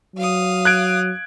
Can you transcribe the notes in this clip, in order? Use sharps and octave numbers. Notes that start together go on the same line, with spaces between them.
F#3 F5 D#6
F#6 G#6 D7